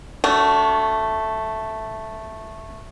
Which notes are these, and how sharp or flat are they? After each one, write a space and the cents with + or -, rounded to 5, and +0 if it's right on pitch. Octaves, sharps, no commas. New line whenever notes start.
A3 +0 D4 -35 F#4 +0